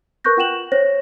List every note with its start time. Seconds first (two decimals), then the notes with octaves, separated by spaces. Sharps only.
0.24 A#4 B4 C#6 F#6 G6 A#6
0.37 F4 F#5 G5 E7 F#7
0.72 C5 C#5 A#6